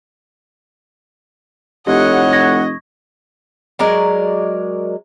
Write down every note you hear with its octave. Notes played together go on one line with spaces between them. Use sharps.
F1 A2 G4 C#5 D#5 F#5
C#6 G#6 A#6
F#3 G#3 A#4 D5